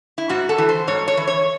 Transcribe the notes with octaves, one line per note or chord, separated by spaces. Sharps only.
E4
G#2 F#4
A4
E3
C5
G#2 C#5
C#5
E3
C#5